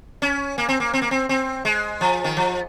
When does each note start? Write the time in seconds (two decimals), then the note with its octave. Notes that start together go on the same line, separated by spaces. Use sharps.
0.22 C#4
0.58 A#3
0.69 C4
0.80 A#3
0.93 C4
1.02 A#3
1.11 C4
1.29 C4
1.65 G#3
2.01 F3
2.24 D#3
2.37 F3